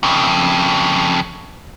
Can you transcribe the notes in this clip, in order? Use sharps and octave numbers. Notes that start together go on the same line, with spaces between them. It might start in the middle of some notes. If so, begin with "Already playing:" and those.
F2 C#3